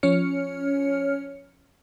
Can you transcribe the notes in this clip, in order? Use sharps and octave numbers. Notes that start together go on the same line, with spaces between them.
F3 C#4 C#5 F6 C#7